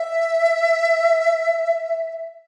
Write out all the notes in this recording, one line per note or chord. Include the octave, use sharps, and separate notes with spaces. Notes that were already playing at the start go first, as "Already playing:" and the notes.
Already playing: E5